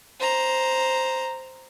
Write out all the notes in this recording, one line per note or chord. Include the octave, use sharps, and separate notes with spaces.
C5 A#5